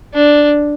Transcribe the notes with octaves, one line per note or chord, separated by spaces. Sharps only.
D4